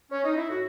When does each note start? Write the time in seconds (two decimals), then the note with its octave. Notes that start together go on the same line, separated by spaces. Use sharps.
0.12 C#4
0.25 D#4
0.37 E4
0.49 A2 F#4